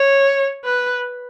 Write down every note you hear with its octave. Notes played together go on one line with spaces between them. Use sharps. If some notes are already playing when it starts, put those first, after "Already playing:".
Already playing: C#5
B4